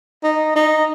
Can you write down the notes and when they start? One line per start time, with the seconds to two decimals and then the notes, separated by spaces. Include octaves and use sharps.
0.23 D#4
0.56 D#4